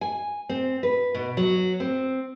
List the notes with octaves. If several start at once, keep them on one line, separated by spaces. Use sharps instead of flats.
G#5
C4
B4
B2
F#3
C4